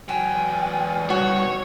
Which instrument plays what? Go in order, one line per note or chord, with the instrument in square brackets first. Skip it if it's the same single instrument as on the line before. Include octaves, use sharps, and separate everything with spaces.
[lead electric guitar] E2 G5 [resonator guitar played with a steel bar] F#3 [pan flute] G#5
[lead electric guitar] B2 G3 [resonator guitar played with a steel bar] F#4 [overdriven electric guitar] C#5